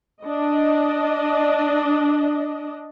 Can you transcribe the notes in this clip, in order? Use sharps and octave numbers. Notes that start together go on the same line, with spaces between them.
D4 D#5